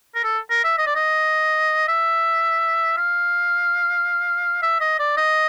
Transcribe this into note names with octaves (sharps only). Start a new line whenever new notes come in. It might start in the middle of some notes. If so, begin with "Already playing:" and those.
A#4
A4
A#4
E5
D#5
D5
D#5
E5
F5
E5
D#5
D5
D#5